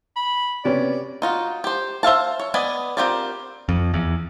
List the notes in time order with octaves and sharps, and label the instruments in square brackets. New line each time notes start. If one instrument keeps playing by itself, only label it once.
[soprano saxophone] B5
[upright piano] C3 B3 C#4 [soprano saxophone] D5
[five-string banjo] D#4 F4 F#4
G4 C5
C5 E5 F5 A5
C#5
B3 B4 D5 D#5 G#5
C4 F4 G4 A#4 D5
[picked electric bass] F2
E2